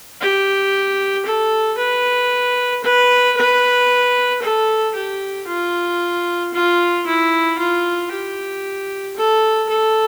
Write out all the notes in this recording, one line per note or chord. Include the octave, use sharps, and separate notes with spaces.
G4
A4
B4
B4
B4
A4
G4
F4
F4
E4
F4
G4
A4
A4